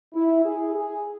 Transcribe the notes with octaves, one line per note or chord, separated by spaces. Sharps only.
E4
G#4
G#4